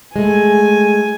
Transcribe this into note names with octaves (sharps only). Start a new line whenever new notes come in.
G#3 A3 G#5